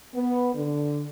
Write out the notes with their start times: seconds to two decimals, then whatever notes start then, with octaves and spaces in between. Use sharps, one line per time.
0.14 B3
0.55 D3